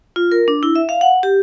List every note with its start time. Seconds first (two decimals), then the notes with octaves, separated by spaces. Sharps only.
0.16 F4
0.32 A#4
0.48 D4
0.63 E4
0.75 E5
0.89 F5
1.01 F#5
1.23 G4